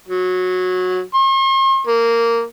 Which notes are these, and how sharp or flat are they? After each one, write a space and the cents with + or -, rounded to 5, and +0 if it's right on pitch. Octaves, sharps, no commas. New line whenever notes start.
F#3 -15
C6 +45
A#3 -10